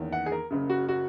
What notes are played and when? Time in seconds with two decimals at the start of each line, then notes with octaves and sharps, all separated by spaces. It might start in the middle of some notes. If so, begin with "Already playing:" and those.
Already playing: E2 D#3 A#3 C#4
0.13 F#5
0.26 G#4
0.32 A#4
0.51 F#1 F#2 C#3
0.70 F#4
0.89 F#4